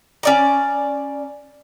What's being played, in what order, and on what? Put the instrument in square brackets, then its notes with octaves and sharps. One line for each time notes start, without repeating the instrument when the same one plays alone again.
[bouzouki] C#4 D5 A#5